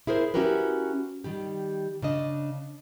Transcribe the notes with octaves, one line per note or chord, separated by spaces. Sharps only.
E4 G#4 A#4 C5
C#4 E4 F#4 G4 A#4 B4
D#3 G3 G4
C#3 D4 D#5